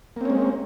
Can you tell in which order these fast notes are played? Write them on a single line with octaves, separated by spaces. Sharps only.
A#3 C4 C#4 G#3